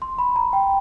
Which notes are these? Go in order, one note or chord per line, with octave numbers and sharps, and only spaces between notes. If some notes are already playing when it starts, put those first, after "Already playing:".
C6
B5
A#5
G5